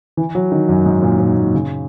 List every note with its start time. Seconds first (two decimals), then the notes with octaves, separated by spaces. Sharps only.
0.17 E3
0.35 F#3
0.52 D#3
0.69 F#2
0.86 G#2
1.02 A#2
1.20 A#2
1.37 A#2
1.54 C#3